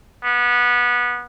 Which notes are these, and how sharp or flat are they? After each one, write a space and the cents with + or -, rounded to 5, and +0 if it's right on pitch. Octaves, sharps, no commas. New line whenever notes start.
B3 -20